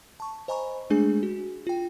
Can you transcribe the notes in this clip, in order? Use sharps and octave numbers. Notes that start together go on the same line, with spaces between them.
A5 C#6
C5 D#5 G#5 A#5 B5 C#6
G#3 A3 D4 G#4 G#5
F#4
F4 G5